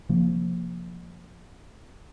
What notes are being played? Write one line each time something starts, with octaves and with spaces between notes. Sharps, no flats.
C3 F3 A#3